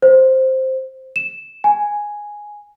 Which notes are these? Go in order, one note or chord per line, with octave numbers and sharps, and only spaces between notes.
C5
E7
G#5